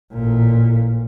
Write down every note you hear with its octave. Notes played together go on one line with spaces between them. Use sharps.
A1 A#2